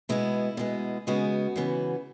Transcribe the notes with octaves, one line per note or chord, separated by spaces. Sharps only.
B2 G#3 B3 E4
B2 G#3 B3
C#3 G#3 B3 F#4
C#3 E3 B3